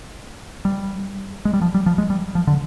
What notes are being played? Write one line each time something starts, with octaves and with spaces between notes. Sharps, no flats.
G3
G#3
G3
F3
G3
F3
G#3
G3
F3
D3